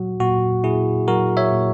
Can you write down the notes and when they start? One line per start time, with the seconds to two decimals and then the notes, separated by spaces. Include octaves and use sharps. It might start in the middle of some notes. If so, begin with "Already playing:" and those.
Already playing: A#2 F#3 F#4
0.20 A#2 F#4
0.64 A#2 E4 G#4
1.08 F#3 F#4 A#4
1.37 C#5 E5
1.52 A#2